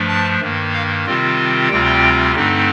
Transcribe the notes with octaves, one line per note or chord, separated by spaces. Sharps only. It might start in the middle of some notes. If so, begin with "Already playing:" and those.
Already playing: G2 F3 A3 D4
A5
G2 D#3 A#3
F5
C3 D#3 G3 C4 F4
D2 C3 G3 C4 F4 G5
G2 D3 A3 C4 D#4